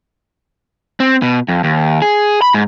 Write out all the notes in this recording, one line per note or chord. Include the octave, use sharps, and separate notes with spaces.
C4
B2
F2
D#2
G#4
B5
G#2